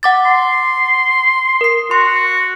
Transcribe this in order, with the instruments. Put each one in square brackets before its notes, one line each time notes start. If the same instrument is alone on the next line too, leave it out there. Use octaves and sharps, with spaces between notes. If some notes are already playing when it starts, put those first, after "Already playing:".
[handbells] F#5 D6 A6
[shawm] C6
[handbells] A#4 C7
[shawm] F#4 [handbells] C6